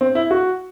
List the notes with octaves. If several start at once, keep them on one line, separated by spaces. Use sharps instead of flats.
C4
E4
F#4